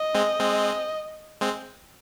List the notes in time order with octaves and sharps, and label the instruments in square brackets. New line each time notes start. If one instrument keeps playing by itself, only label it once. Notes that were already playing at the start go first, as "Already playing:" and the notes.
Already playing: [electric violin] D#5
[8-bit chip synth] G#3 C4
G#3 C4
G#3 C4